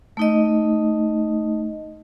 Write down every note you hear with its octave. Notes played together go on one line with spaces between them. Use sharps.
A3 D#4 D#5